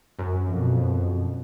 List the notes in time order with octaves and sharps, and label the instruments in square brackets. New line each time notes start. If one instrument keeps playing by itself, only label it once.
[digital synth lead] F#2
[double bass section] F2 B2